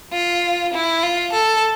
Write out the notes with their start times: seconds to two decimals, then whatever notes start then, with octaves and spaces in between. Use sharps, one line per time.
0.13 F4
0.74 E4
1.03 F4
1.33 A4